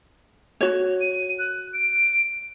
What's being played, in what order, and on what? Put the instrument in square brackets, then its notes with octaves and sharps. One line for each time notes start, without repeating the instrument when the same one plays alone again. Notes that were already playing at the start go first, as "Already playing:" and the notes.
[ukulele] F#4 C#5
[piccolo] D#7
F#6
D7